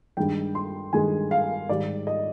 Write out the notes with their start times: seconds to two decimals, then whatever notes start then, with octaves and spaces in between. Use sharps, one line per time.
0.17 G2 D#3 G#3 G5
0.55 C6
0.93 G2 D#3 G#3 G#5
1.31 F5
1.69 G#2 D#3 G3 D5
2.07 D#5